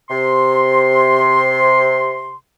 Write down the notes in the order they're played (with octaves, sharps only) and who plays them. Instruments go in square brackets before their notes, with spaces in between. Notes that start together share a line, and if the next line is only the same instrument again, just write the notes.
[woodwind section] C3 C6